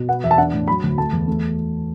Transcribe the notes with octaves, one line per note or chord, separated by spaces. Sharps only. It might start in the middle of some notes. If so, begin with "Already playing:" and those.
Already playing: B2
B3 F#5
E2 E5
A5
D4 F#5
A2
F#3 B5
D2
A3 A5
E2
A3